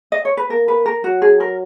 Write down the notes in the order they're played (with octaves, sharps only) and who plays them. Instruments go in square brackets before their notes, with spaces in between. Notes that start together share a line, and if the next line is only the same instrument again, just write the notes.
[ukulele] D#5
C#5
B4
[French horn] A#3 [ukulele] A#4
[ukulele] B4
A#4
[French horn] F#3 [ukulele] F#4
[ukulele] G#4
A#4